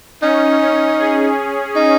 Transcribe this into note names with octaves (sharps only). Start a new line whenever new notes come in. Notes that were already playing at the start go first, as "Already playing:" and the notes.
C#4 D#4
C#4
G#4
D#4